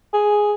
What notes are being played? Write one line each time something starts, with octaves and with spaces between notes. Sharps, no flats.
G#4